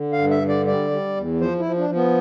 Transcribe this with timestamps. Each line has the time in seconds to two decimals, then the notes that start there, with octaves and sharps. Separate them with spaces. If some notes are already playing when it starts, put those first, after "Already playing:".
Already playing: D3
0.12 F5
0.18 G2
0.31 E5
0.42 D3
0.49 D5
0.67 G3 D5
0.91 G3
1.16 E2
1.41 F3 C5
1.59 E4
1.65 F3
1.78 D4
1.89 F3
1.95 B3